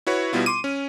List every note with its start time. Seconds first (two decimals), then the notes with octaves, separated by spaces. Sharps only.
0.07 E4 F#4 B4 C#5
0.33 B2 G3 B3 E4 F4
0.46 C6 D6 D#7
0.64 C#4